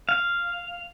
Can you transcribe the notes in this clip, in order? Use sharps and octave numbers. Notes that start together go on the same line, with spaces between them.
F5